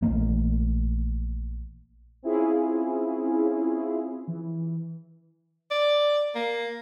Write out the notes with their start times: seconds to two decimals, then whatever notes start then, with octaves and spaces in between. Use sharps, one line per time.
0.02 A#1 E3 A3 A#3
2.23 C4 C#4 E4 F4 G#4
4.27 E3
5.71 D5
6.35 A#3